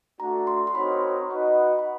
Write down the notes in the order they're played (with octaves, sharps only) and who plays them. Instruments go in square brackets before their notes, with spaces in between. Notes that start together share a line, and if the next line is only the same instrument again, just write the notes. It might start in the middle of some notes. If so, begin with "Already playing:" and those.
[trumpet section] A3 D4 F#4 [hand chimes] A#5
[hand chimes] C6
C6
[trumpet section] C4 D#4 F#4 A#4 C#5 [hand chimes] B5
[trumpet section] D#4 F#4 B4 D#5 F#5
[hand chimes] B5